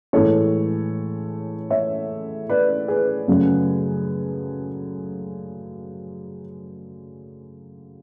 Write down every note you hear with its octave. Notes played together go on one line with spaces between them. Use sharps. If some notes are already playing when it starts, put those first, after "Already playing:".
A2 E3 G#3 A4 C#5
C#5 E5
B4 D5
G#4 B4
F#2 C#3 F#3 A3